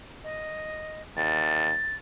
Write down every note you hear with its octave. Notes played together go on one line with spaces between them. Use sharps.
D#5
D#2 A6